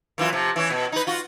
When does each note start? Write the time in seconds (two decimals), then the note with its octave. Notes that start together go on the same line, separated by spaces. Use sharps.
0.18 F#2 E3 F4
0.33 C3 F3
0.56 E3 C#4
0.70 B2
0.92 D#4 B4
1.07 F4 F#4